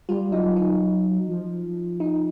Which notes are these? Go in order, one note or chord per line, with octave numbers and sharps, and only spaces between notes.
G3 F4
F#3 D#4
D#4
F3
D#4